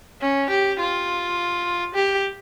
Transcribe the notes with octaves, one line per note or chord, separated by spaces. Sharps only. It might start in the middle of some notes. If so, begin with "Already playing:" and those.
C#4
G4
F4
G4